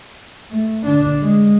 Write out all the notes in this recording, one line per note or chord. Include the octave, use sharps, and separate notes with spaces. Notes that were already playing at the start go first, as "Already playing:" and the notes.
A3
D3 D4
G#3